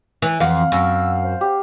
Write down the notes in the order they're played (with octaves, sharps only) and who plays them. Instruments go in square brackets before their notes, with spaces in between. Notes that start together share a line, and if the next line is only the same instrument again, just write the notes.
[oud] E3
[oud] F2 [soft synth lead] E3 [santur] F5 F#5
[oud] F#2 [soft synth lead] E6
[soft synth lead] C5
[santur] G4